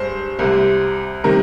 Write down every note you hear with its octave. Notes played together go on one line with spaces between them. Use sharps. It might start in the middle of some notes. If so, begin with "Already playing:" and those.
Already playing: G2 G#3 C5
C2 C3 G3
C3 D#3 G3 A#4